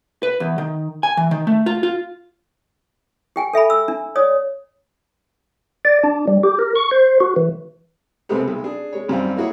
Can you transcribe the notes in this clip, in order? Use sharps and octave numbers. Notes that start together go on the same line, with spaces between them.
B4
E2
D#3
G#5
E3
D#3
A3
F4
F4
G4 G5 G#5
A4 E5 G#5 B5
E6
D4
C#5 D5 D#6
D5
D4
G3
G4
A#4
C#6
C5
F#4
E3
C#2 C3 G#3 A3 B3 C4
B1 G#3
D4 G#4
G#3 C#5
G#1 F#2 G3 C4 F5
A#3 E4 F#4 G#4 C#5